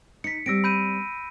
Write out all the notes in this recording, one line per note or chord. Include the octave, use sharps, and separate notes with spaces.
D#4 B6 C#7
G3 C4 E6 A#6 D7
B5 G6 D#7